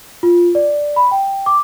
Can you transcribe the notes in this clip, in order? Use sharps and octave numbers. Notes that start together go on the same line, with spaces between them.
F4
D5
B5
G5
D6